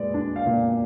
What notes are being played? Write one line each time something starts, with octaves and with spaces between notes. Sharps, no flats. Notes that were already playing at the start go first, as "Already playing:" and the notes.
Already playing: A#2 G#3 B4 D5
D4
F5
A#2